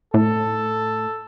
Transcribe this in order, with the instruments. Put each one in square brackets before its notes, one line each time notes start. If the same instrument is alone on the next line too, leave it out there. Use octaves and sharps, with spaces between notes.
[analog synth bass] A2 [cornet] A4